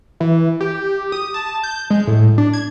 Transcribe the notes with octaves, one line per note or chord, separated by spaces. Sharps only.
E3
G4
D#6
A5
G6
G#3
A2
D4
G#6